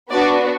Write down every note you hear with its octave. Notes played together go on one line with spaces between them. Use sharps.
B3 D4 F#4 D5